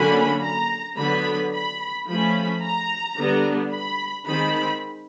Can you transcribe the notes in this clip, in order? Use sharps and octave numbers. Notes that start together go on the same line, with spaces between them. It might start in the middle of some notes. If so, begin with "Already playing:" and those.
Already playing: D3 F#3 A#3 C#4 B5
A#5
D3 F#3 B3 B5
B5
F3 A3 C#4 B5
A#5
D3 G3 B3 D4
B5
D#3 G#3 C4 B5